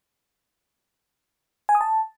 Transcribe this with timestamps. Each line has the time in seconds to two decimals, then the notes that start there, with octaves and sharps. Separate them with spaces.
1.69 G#5
1.75 D#6
1.81 A5